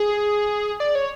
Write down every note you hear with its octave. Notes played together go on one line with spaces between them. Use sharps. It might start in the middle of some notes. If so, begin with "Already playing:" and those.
Already playing: G#4
D5
C#5